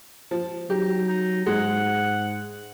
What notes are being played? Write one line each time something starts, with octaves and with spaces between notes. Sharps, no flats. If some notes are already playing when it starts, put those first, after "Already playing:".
F3
F#3 D#4 G4
D#4
G#2 G#3 F#5